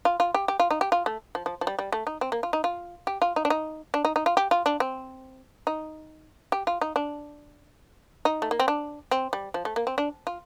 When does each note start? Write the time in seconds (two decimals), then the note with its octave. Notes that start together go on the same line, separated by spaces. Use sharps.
0.05 F4
0.20 F4
0.34 G4
0.48 G4
0.60 F4
0.71 D#4
0.81 G4
0.92 F4
1.06 A3
1.35 F3
1.46 F3
1.61 F3
1.67 G3
1.79 G3
1.92 A3
2.07 D#4
2.21 C4
2.32 A#3
2.43 F4
2.53 D#4
2.64 F4
3.07 G4
3.22 F4
3.36 D#4
3.45 D4
3.50 D#4
3.94 D4
4.05 D#4
4.16 D#4
4.26 F4
4.37 G4
4.51 F4
4.66 D4
4.80 C4
5.67 D#4
6.52 G4
6.67 F4
6.81 D#4
6.96 D4
8.25 D#4
8.42 A3
8.51 A#3
8.60 C4
8.68 D4
9.11 C4
9.33 G3
9.54 F3
9.65 A3
9.76 A#3
9.87 C4
9.98 D4
10.27 F4